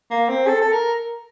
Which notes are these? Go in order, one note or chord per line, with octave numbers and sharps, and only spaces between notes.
A#3
C4
A4
A4
A#4